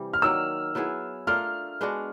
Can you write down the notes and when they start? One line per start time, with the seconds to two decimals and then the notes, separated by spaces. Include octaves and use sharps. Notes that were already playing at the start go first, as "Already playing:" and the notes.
Already playing: C3 E3 G3
0.13 F6
0.22 D#3 F#3 A#3 E6
0.75 F#3 B3 E4 G#4
1.27 A3 D4 F4 A#4 F6
1.81 G#3 B3 D4 F#4